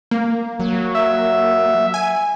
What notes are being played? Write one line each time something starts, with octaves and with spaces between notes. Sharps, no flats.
A#3
F#3
E5
G#5